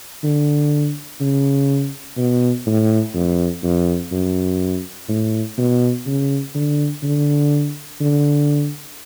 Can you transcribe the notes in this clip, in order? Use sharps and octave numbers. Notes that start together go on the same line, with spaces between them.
D3
C#3
B2
A2
F2
F2
F#2
A2
B2
C#3
D3
D3
D3